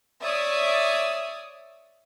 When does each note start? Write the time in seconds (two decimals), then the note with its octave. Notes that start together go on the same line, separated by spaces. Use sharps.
0.21 C#5 D5 E5 D#6